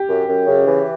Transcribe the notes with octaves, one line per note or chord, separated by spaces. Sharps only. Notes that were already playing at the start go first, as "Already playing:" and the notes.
Already playing: G4
F#2
F#2
C#3
E3